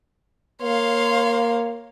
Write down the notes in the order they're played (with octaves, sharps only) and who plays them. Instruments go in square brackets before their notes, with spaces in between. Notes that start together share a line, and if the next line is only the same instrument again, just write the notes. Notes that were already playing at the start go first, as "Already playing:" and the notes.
[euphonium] A#3 [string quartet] C#5 F5 C6